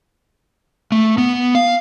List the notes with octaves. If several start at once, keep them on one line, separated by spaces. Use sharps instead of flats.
A3
B3
F5